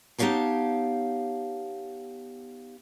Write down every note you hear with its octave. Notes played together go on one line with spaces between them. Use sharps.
B3 D#4 G4 C#5 F5 A5